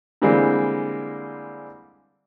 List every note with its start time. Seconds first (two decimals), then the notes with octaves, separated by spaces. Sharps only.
0.22 D3 E3 G3 G#3 A#3 C4